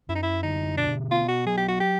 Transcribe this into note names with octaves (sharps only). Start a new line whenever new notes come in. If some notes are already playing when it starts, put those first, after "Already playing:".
F#2 E4
D#4
E4
D3 D#4
B2 D4
B3 F4
F#4
F#3 G#4
G4
F#4
G4